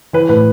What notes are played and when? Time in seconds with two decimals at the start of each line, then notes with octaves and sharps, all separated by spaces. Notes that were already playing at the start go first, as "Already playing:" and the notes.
0.13 E3 B4
0.29 A2 B4